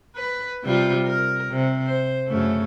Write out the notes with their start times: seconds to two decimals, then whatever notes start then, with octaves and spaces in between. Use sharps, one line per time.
0.16 B4
0.63 C3 G3 F4
1.06 A#4
1.51 C3
1.87 C5
2.28 F#2 C#3 A3